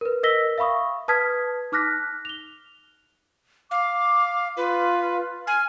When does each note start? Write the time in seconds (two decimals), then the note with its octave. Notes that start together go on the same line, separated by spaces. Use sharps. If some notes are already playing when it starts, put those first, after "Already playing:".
0.01 A#4 B4
0.23 A#4 D#5 E6 A#6 B6 G7
0.58 E5 F5 B5 C#6 D#6
1.08 B4 A5 D#6 F6 G#6 B6
1.72 D#4 D6 F6 F#6 A#6 B6
2.25 F7 G7
3.71 F5 D6
4.57 F4 B4
5.47 G#5 F6